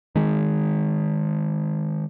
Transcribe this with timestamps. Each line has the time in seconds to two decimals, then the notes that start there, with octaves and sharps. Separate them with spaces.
0.15 D#3 G#3